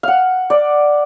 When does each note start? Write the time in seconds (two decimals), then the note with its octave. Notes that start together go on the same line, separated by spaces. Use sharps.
0.03 F5 F#5
0.50 D5